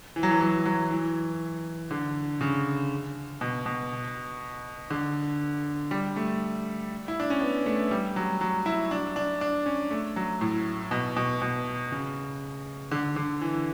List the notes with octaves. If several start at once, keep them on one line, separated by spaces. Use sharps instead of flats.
E3
F#3
E3
F#3
F#3
E3
D3
C#3
B2
B2
D3
G3
A3
E4
D4
C#4
B3
A3
G3
F#3
F#3
E4
D4
D4
D4
C#4
A3
F#3
A2
B2
B2
B2
C#3
D3
D3
E3